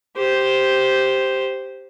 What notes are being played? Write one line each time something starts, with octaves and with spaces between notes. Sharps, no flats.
G4 C5